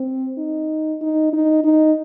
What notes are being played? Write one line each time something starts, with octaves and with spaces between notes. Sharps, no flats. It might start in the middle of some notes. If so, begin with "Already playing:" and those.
Already playing: C4
D#4
D#4
D#4
D#4